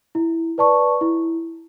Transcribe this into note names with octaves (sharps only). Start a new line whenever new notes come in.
E4
B4 D5 A5 C#6
E4